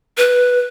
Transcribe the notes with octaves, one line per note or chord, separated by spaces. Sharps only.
B4